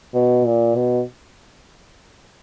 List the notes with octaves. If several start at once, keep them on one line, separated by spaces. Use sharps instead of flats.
B2
A#2
B2